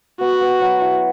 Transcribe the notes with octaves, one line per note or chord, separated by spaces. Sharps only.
B3 F#4
B3
F#3
E4